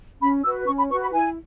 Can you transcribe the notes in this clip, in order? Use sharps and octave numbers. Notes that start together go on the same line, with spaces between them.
C#4 B5
F#4 B4 E6
C#4 C#6
B5
F#4 B4 C#6
B5
E4 G#5